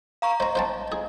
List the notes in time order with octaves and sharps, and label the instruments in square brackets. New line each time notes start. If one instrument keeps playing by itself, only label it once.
[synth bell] F5 A#5 C#6
[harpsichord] C5 A#5 [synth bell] D#5
[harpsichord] C5 G5 A5
G#4